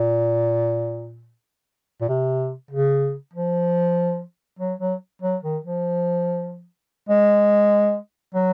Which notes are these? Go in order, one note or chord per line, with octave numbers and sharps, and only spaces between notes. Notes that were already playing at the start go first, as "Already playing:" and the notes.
Already playing: A#2
A#2
C3
C#3
F3
F#3
F#3
F#3
D#3
F3
G#3
F#3